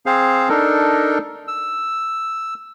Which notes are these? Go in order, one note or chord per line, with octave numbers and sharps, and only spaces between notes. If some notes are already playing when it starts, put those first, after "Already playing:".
C4 G#4 C5 F5
D4 D#4 A4 A#4
E6